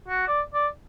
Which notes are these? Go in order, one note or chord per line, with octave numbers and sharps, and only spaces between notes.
F#4
D5
D5